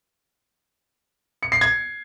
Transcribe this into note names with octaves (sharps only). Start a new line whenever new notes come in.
C#7
C7
G#6